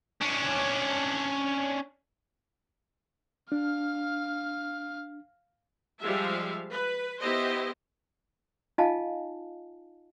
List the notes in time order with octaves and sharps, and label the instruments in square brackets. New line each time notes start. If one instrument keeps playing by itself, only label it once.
[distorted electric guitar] C#4 D4
[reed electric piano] D4 [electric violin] F5 F6
[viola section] F3 G3 G#3 E5 F5
B4
B3 E4 G4 C5 D#5
[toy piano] D#4 F4 D#5 F5 G#5 A5